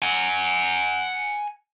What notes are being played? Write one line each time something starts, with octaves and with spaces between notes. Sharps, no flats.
F#5 G#5